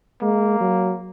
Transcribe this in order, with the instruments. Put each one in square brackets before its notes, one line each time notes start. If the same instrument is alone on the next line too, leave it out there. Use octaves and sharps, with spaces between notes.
[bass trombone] G#3 [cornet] A#3
[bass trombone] F#3